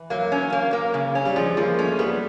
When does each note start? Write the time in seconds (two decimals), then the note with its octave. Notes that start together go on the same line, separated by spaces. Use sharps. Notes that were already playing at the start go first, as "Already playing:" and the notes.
Already playing: E3
0.10 F#3 A#3
0.32 C#4
0.52 A#3
0.73 A#3
0.94 C#3
1.15 C#4
1.25 G3
1.36 F3 G#3
1.57 F3 A#3
1.78 A3 C#4
1.99 G3 B3